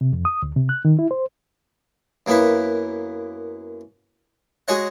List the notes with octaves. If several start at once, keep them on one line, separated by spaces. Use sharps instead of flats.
C3
F2
D#6
D2
C3
F#6
D#3
E4
C5
F#2 A#3 B3 E4 B4
G#3 F#4 G#4 C#5 D#5 F#5